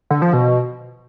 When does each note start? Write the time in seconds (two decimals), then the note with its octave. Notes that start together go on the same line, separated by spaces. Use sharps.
0.10 D3
0.22 F3
0.33 B2